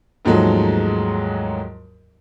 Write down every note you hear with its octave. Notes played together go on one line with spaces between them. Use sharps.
D#2 G#2 F3 F#3 G#3 A3